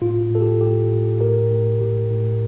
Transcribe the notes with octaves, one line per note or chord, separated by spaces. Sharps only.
A2 F4
F4
A2 A4
G4
A2 G4
A2
A2 G4 A#4
A2
A2 G4
A2